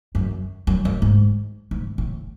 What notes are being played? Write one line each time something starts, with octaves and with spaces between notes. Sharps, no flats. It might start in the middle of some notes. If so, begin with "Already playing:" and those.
F#2
F#2
F#2
G#2
G#2
A2